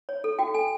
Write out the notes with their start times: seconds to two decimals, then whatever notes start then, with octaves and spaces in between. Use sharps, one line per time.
0.09 C#5
0.24 A4
0.39 F#4 G5
0.54 A4 G#5